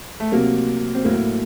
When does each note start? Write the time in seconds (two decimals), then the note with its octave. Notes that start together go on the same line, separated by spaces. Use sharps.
0.20 A3
0.32 C3 F#3 A#3
0.95 C4
1.05 A2 F#3 A#3